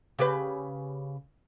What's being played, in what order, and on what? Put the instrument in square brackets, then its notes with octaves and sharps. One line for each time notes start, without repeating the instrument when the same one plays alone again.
[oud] C#3 G4 B4